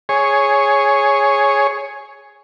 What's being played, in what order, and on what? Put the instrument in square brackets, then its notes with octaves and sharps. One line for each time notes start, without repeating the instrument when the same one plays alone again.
[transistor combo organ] G#4 C#5